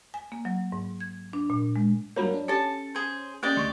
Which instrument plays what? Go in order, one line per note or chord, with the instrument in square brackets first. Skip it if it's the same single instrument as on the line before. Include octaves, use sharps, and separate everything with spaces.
[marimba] G#5
A#3
F#3
G#2
G#6
D4
A#2
G#3
[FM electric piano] G2 F#3 A#3 [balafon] C#5 B5
[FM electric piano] D4
[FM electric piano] C#4 [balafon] G4 [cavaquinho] A4 A5
[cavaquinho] G#4 C5
[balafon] A#3 C#4 [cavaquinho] G4 D5 D#5
[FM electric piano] D2 C#3 [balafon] C6 C#6